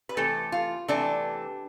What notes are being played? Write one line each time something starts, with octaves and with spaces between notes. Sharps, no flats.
B4
C3 E3 A3 A4
F4
C3 E3 A3 D4